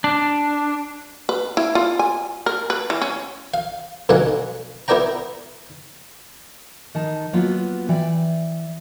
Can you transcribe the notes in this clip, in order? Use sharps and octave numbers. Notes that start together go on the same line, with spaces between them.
D4
B4
E4
F4
G#5
A#4
B4
E3
C#4
F5
B1 B2 D3 A#3 F#5 G#5
B3 E4 A#4 D5 G5 A#5
D#3 D#4 A5
F#3 A#3 B3 F4 F#4
E3 D5 E5 G5